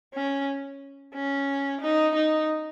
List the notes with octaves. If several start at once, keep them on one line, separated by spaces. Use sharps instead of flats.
C#4
C#4
D#4
D#4